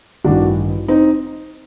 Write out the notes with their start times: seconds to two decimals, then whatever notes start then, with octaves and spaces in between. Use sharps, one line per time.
0.24 A1 G2 D#3 D4 F#4
0.88 C4 D#4